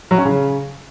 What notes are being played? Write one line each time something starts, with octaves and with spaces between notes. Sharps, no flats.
F#3
C#4
C#3